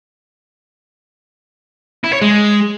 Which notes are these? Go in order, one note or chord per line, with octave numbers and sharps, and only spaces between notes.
E4
C#5
G#3